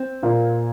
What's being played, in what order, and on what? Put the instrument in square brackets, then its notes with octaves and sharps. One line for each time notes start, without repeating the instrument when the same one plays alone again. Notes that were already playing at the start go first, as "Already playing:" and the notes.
Already playing: [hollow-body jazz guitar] C4
[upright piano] A#2 A#3 F4